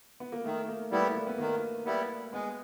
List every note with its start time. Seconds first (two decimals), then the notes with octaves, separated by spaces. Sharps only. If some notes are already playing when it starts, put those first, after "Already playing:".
0.20 B3
0.32 A#3
0.44 D#3 A3
0.68 A#3
0.91 G3 A3 B3 E4
1.16 A#3
1.27 B3
1.38 D#3 A#3
1.85 G3 B3 E4
2.32 G#3 B3